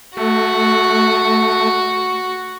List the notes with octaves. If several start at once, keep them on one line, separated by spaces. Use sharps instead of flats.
A3 F#4